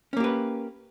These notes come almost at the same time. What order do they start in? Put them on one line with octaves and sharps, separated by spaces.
C#4 A#3 G4 B4